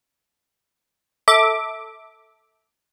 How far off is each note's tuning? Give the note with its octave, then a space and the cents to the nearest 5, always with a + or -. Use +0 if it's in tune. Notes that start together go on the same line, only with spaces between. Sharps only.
A4 +5 E5 -25 D6 +0